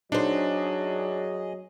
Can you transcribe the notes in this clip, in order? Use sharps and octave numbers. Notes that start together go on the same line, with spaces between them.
F#3 D4 D#4 G#4 C5 D#5